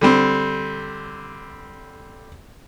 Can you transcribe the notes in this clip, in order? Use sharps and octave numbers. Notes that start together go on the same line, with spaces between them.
D3 G3 C4